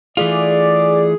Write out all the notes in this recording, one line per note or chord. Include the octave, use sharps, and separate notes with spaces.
E3 A3 F4 G#4 D5